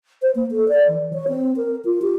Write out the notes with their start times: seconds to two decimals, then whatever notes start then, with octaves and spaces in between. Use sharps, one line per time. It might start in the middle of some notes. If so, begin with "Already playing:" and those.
0.22 C5
0.35 A#3
0.51 A4
0.68 D5
0.88 E3
1.13 C#5
1.28 C4
1.57 A#4
1.85 F4
2.02 G4